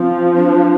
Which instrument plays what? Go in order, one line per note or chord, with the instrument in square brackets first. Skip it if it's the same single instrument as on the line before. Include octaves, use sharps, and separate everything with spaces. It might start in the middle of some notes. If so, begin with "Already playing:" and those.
Already playing: [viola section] F3 [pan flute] C4
[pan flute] D4